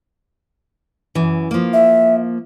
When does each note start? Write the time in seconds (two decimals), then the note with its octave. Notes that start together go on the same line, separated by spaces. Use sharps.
1.15 F#2 E3
1.51 F3 A#3
1.73 E5